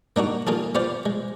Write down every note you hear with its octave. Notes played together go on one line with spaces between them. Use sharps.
A#3 D4 D#4 F#4
A#3 F4 G#4 A4
B3 F4 C5 D5
G#3